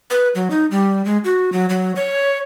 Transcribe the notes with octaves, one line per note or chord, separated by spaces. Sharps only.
B4
F#3
D#4
G3
G#3
F#4
F#3
F#3
C#5